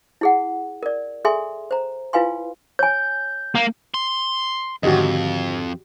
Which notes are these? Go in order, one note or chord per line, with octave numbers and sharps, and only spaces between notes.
E4 G#4 F#5
A#4 D5
G#4 A4 E5 G#5 C6
C5 A#5
E4 F4 B4 F5 G#5 C6
C#5 G#5 G6
A#3
C6
F2 G#2 D3 D#3 F#4 G4 D#5